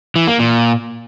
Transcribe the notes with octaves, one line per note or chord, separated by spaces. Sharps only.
E3
A#3
A#2